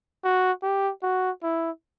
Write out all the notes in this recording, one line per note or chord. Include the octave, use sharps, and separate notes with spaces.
F#4
G4
F#4
E4